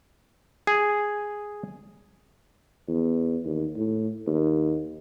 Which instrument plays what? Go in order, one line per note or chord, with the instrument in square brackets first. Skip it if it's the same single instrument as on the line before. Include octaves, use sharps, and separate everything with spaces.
[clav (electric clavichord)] G#4
[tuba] E2
D#2
A2
D#2